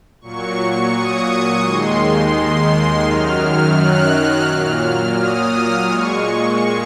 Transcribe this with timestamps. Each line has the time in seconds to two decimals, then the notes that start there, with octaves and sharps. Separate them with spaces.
0.21 A#2 F#3 C#6
0.92 D#6
1.63 D#2 D#3 G#3 C6
3.05 F#2 D#3 F#3 F6
3.76 F#6
4.46 A#2 F#3 F6
5.17 D#6
5.88 A#2 G#3 C#6